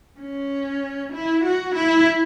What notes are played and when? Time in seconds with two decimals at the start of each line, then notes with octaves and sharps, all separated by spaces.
0.19 C#4
1.12 E4
1.43 F#4
1.74 E4